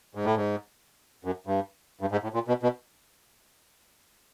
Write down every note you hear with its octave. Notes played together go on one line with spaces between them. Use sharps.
G#2
A2
G#2
F#2
G2
G2
G#2
A2
A#2
B2
B2